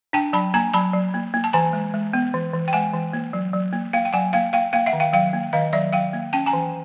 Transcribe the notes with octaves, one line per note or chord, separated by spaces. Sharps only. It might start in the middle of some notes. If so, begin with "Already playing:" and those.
D4 G5 A5
F#3 A5 B5
A#3 G#5 A#5
F#3 A5 B5
F#3
A#3
A#3
A5
E3 G#5 A#5
G#3
G#3
B3
E3
E3
G5
G#3 F#5 G#5
E3
A#3
F#3
F#3
A#3
A#3 F5 G5
G5
F#3 F#5 G#5
A#3 F5 G5
A#3 F5 G5
A#3 F5 G5
E5 F#5
D#3
F5 G5
F#3 F5 G5
A#3
D#3 D#5 F5
F#3 D5 E5
F#3 F5 G5
A#3
C#4 G5 A5
G#5 A#5
E3